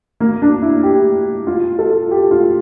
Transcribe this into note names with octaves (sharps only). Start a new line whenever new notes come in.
A#3
D4
E4
G4
F4
A4
G4
F4